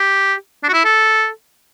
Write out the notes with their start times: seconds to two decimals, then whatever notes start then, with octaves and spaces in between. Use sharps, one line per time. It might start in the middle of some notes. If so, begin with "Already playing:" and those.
Already playing: G4
0.63 D4
0.69 F#4
0.73 E4
0.85 A4